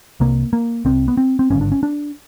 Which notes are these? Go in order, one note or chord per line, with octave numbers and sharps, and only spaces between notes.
C2 C3 A#3
A#3
C2 C3 C4
B3
C4
C4
G#1 G2 D3 C#4
D4
C#4
D4